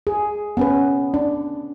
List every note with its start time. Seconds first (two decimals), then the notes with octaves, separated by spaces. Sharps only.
0.07 G#4
0.57 B3 C#4 B4
1.14 D4